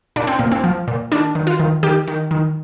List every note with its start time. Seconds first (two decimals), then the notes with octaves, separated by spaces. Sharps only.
0.16 A#2 D4
0.27 C4
0.39 A#2 A#3
0.52 C4
0.64 F3
0.88 A#2
1.12 D#3 D4
1.35 D#3
1.47 F4
1.60 D#3
1.83 D#3 G4
2.08 D#3
2.31 D#3